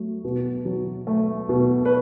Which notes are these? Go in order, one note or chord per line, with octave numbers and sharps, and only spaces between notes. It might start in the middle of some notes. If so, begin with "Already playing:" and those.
Already playing: F#3 A3
B2
F#3
A3
B2
B4